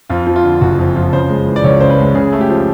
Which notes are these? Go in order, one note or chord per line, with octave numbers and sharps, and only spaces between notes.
F2 F4
F3
F4
D3
F#1 F#4
F2
F3
C#3 C5
G#3
E3
D5
C#2 C#5
C#3 C5
B4
G#3
C#3 G#4
A3
G4
F3